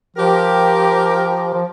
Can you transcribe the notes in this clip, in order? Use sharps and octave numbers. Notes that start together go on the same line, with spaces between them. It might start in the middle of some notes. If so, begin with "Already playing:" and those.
F3 G4 A#4
F3